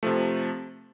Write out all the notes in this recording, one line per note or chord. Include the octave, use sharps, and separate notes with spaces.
C3 F3 A3